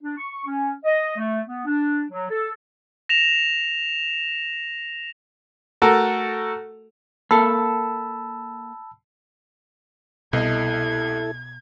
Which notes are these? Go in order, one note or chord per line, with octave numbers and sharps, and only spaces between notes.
D4
C#6
C#4
D#5
A3
B3
D4
F#3
A4
A#6 E7 F7
A3 F#4 A4 A#4
A#3 A4 A5 B5 E6
C2 B2 E4 A4 D#5 G#6